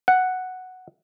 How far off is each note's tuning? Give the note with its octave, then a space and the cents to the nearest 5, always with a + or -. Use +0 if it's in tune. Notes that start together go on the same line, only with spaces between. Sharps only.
F#5 +0